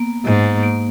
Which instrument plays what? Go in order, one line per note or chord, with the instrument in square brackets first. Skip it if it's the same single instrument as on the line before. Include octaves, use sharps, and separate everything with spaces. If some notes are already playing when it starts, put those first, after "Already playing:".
Already playing: [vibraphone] A#3 B3
[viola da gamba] G#2
[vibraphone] A#3